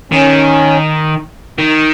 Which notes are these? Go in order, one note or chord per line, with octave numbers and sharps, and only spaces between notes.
D#3 C#4
D#3